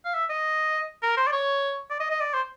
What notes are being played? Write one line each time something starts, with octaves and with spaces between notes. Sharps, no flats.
F5
E5
D#5
A#4
C5
D5
C#5
D5
D#5
D#5
D5
C5